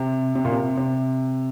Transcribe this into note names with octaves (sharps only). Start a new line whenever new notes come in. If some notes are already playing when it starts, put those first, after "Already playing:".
Already playing: C3
C3
A#2
C3
C3